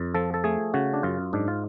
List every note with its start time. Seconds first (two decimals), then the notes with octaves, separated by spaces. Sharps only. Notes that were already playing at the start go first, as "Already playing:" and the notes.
Already playing: F2
0.14 F3 A4
0.34 A4
0.44 A3 G#4
0.74 C#3 F#4
0.94 D4
1.03 F#2 F4
1.33 G#2 D4
1.48 F4